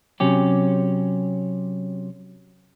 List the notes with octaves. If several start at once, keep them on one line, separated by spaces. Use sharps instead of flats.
C3 F#3 C#4 G4